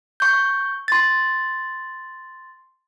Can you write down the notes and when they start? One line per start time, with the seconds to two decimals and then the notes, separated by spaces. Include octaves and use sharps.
0.20 C#6 G6
0.88 C6 A6